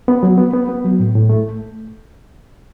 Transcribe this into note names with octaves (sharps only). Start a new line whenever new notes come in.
B3
F#3
B3
B3
B3
F#3
A2
A2
A3